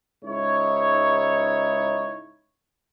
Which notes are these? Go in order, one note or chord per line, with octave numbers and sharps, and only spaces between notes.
C#2 G#2 D#4 E4 C#5